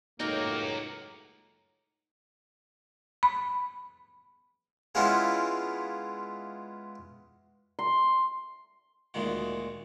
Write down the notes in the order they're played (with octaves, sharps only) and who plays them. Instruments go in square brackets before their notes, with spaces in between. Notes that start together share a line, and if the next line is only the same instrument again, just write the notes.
[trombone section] C#2 F#2 A2 [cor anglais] A#3 [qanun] D#4 G5 [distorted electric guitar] F#4 A#4
[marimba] B5
[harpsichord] G#3 B3 C#4 E4 F4 G#4
[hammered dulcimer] C6
[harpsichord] D2 A#2 D#3 G#3 F#4